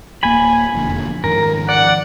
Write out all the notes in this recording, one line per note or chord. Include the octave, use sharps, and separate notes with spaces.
D1 A#3 G#5 B5
E1 F2 D3
G#2 D#3 F3 A#4
D5 F#5